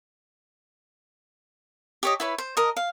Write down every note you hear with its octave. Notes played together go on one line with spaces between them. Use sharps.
G4 C#5 D#5
E4 B4 C#5
C5
A#4 D#5
F5